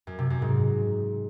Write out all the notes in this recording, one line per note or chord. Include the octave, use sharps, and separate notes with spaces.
F#2
C3
F#2
G#2